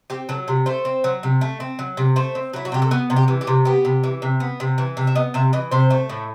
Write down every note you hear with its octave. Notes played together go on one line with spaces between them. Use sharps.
C4 G4
F#3 A4
C3
A3 C5
C4
F#3
C3
A3
C4
F#3
C3
A3 C5
C4
F#3 E4
F#4
C3 G4
A4
B3 B4
C3
G4
E3
G4
C3
B3 G4
C3
E3
C3
B3
C3
E3
C3
E5
B3 D#5
C3 E5
E3 D#5
C3 C5
A3
A2